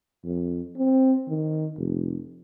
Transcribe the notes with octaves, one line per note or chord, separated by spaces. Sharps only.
F2
C4
D#3
F1